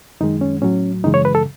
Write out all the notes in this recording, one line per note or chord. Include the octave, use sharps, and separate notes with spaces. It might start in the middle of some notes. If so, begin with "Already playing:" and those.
F#2 D#3 G#3 D#4
C#4
A2 F#3 C#4
F#2 C#3 E3 G#3 D#4
C#5
B4
A4